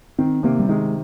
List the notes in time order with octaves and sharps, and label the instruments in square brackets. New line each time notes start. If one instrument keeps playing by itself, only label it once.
[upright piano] D#3 [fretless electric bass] C4
[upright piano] C3 [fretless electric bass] A#3
[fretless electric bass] G3
[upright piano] D#3 [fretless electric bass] G#3